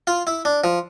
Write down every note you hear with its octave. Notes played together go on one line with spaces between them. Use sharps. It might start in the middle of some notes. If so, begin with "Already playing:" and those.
F4
E4
D4
F3